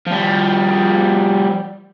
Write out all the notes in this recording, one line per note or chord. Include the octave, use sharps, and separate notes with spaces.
F3 G3